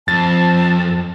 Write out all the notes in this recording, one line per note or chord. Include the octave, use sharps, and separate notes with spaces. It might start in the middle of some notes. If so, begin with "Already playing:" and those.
F2 A5 A6